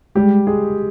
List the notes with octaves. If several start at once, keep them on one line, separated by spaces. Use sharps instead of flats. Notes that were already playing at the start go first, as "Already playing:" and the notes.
G3 G#3 G4
G#3 G#4